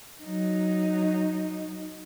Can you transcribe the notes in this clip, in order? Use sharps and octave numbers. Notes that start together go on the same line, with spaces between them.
F#3 D#4